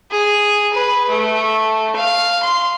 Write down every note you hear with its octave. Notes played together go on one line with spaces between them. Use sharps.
G#4
B4
A3
F5
C6